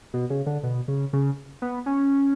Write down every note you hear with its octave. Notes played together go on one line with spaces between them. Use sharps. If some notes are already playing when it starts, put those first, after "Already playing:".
B2
C#3
D3
B2
C#3
C#3
B3
C#4